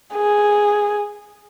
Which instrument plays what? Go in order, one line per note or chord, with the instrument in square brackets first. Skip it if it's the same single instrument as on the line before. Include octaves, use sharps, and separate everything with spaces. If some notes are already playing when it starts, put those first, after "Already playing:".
[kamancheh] G#4